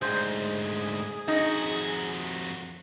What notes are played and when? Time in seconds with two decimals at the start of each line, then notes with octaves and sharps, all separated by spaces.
0.02 D2 G#2 G#4 C5 G#5
1.28 F2 D#4 F#4